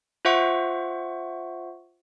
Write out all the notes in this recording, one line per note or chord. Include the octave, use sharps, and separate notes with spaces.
F4 C5 E5 F#5 C#6